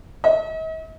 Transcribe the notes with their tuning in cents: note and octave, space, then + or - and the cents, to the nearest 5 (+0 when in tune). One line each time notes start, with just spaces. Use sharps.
D#5 +45